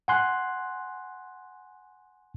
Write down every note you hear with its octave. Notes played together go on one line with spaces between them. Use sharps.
F#5 G#5 C6 F#6